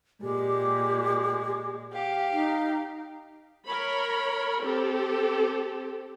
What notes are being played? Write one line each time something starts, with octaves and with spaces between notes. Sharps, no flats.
A#2 G#3 G4
G4 F5
D#4
A#4 C#5 B5
C4 G4 A4